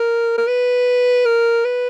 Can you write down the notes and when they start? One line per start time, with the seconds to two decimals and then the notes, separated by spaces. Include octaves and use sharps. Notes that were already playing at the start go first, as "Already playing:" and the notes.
Already playing: A#4
0.38 A#4
0.47 B4
1.26 A#4
1.65 B4